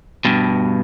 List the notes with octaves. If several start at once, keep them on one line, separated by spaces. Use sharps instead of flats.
G2 B2